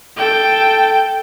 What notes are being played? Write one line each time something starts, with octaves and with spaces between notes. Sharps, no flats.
A4 G5